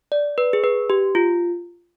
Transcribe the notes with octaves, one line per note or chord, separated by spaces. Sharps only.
D5
B4
G#4
B4
G4
F4